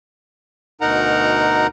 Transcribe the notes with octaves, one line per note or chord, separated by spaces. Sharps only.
D2 B2 D#4 A#4 F#5 A#5